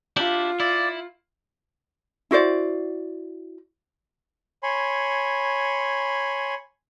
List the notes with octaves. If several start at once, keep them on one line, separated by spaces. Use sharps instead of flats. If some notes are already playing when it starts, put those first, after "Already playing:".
D4 E4 F4 G4
E4 D5
E4 F#4 C5 D5
C#5 G#5 B5 C6